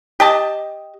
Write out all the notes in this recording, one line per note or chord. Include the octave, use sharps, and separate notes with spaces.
G4 D#5 A5